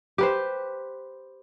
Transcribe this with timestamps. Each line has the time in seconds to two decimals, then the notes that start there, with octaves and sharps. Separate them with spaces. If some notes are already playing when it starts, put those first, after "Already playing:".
0.18 G4 B4 C5